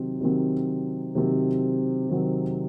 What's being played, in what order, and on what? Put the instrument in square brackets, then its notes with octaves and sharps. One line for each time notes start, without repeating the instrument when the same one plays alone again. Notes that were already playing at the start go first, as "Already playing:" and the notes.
Already playing: [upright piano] C3 D#3 F#3 C4
C3 D#3 F#3 C4
C3 D#3 F#3 C4
C3 D#3 F#3 C4